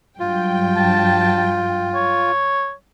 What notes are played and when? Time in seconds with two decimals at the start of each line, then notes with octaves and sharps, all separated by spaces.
0.20 G2 F#3 F4 G5
0.76 A5
1.95 C#5